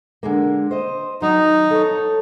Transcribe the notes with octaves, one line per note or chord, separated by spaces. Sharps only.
D3 G#3 A#3
C5 D#5
D#3 F#3 D#4
A4 C#5